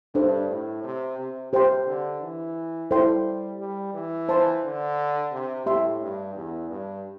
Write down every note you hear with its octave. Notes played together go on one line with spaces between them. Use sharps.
G2 D4 A4 C5
A2
C3
C3
C3 G4 C5 G5 C6
D3
E3
G3 E4 A4 C5 G5 C6
G3
E3
C5 A5 C6
D3
C3
A2 G4 E5 C6
G2
E2
G2